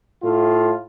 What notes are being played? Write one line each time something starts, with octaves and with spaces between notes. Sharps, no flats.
A2 F4